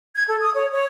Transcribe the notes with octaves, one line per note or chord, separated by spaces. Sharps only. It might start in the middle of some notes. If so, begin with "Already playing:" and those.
G#6
A4
D#6
C#5
C#5